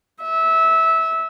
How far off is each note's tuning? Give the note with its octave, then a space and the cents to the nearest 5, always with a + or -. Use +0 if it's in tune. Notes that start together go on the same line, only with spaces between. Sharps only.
E5 -20